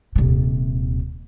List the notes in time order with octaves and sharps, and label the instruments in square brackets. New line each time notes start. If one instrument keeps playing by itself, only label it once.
[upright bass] D#1 C3